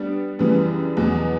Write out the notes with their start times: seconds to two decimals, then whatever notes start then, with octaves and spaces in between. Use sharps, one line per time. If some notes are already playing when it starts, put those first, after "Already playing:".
Already playing: G3 B3 D4
0.39 F#2 C#3 E3 G3 B3
0.97 E2 B2 F#3